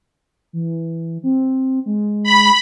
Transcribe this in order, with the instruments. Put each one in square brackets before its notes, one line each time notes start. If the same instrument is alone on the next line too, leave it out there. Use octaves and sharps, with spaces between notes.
[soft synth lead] E3
C4
G#3
[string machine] B5